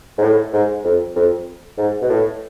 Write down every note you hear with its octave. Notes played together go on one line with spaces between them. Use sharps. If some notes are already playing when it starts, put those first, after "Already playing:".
G#2
A2
G#2
F2
F2
G#2
B2
A2